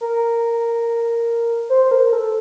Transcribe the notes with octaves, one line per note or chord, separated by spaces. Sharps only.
A#4
C5
A#4
A4